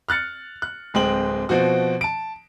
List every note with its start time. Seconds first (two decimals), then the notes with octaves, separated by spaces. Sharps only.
0.09 F6 F#6 A6 C#7
0.62 F#6
0.94 D1 G#3 C4 G5 F#7
1.49 B2 F3 C4 F#4
2.01 A5 D7